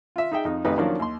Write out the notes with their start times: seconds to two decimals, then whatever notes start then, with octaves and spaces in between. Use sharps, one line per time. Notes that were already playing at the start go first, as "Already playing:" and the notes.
0.16 F4 E5
0.32 D#4 G#4 E5 G5
0.45 F2 D#4
0.65 A1 F2 D#4 G4 B4
0.78 D#3 F3 F#3 A#3 C#4 D4
0.99 D#2 C6